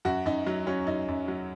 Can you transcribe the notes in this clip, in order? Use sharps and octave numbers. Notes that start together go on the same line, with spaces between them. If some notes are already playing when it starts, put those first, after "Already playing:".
F#2 F#4
F#2 D#4
F#3
F#3 C#4
F#2 D#4
F#2
F#3